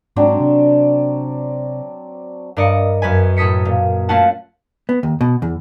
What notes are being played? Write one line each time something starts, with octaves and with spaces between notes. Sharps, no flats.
G#2 F#3 C4 D4
C3
G2 A#4 D5 D#5 C#7
F#2 B4 G#5
A2 A4 D#6 B6 C#7
A#2
A3 C#4 F4 F#4 F#5 A5
B3
D#2
B2
E2